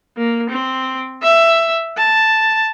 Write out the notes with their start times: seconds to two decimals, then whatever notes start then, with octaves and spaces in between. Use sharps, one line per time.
0.17 A#3
0.50 C4
1.23 E5
1.97 A5